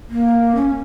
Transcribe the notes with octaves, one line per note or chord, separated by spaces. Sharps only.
A#3
C#4